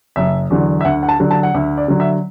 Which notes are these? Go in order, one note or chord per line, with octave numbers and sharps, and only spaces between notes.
F#1 E5
E2 D3 F#3
E5
D2 F#5
F#5
A5
D3 F#3
A5
F#5
D2 E5
D5
D3 F#3
E5